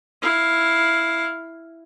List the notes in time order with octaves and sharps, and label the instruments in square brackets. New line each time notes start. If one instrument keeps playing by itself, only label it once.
[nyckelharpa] E4 F5